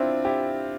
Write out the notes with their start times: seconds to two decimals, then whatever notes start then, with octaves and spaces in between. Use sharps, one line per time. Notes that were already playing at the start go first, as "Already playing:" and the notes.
Already playing: C4 D4 E4 F4
0.25 E4 G4